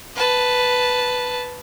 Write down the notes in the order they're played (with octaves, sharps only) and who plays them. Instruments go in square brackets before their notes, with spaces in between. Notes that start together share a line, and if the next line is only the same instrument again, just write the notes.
[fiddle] B4 A5